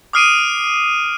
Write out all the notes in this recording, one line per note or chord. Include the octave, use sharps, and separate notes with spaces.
D6 D#6 F6 C7 D7 D#7